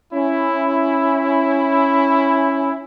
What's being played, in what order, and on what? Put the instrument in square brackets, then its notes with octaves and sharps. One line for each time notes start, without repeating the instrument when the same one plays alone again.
[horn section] C#4 E4